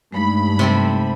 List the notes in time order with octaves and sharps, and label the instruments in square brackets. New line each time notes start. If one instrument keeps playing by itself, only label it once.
[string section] G2 B5 [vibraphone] G#3 A3 D#4
[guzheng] C3 C4 A4